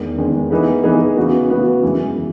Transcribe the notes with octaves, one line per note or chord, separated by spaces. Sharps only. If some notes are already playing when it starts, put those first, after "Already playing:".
Already playing: E2 D#3 G#3
E2 D#3 G#3
E3 B3 D#4 G#4 B4
E3 B3 D#4 G#4 B4
C#3 E3 B3 F#4
C#3 E3 B3 F#4
F#2 E3 G#3
E3